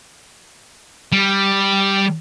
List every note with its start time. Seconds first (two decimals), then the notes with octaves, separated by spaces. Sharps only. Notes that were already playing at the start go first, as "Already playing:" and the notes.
1.12 G3